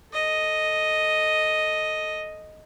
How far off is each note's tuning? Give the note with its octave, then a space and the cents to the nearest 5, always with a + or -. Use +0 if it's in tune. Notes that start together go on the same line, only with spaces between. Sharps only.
A4 +0 D#5 +0